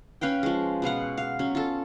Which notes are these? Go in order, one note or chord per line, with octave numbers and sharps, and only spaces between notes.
C#4 B4 F5 G5
F3 G#3
B2 B3 F5 F#5
F5
F#3 C#4
F4 A4